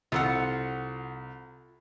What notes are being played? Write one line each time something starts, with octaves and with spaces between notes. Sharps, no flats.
C2 F4 A4 F#5